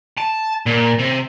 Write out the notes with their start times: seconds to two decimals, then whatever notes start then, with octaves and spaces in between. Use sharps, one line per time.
0.17 A5
0.66 A#2
0.99 C3